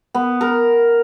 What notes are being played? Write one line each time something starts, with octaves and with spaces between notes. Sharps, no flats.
B3
A#4